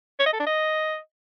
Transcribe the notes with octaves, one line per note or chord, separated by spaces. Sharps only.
C#5
D#5
A4
D4
D#5